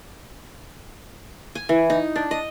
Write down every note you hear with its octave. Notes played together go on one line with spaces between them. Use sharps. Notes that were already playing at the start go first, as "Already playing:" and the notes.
G#5
E3
D#4
D4
D#5